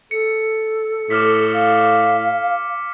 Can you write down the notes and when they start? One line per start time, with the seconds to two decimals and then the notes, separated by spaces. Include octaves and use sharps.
0.11 A4 C#7
1.10 A2 D6 F6 B6
1.53 F5